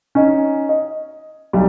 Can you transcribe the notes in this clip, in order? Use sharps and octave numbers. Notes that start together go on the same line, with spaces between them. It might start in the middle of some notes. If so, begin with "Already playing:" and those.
C#4 D#4
D#5
B1 G3